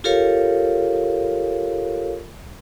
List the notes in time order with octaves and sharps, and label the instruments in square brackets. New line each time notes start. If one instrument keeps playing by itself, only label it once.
[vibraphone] F4 G4 A4 A#4 C#5 F5